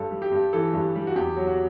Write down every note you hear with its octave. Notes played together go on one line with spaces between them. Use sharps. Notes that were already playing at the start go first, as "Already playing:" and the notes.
Already playing: G2 A4
G3
G4
G2
E3 A4
G2
G3
F#4
E2 G4
F#3
F#4